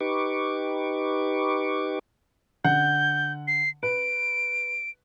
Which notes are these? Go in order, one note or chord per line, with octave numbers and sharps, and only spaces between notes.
D#4 G4 B4 C#6 D6
D3 F#5 G6
C7
B4 D7